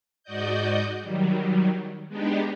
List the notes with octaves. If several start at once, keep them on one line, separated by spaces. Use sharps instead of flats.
G#2 F#4 D5 D#5 G6
D#3 F#3 G3
G#3 B3 D4 D#4 G4